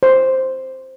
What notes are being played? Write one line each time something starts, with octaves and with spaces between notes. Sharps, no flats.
C5